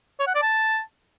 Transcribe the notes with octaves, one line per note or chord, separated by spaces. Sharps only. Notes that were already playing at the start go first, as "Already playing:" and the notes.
C#5
F#5
D5
A5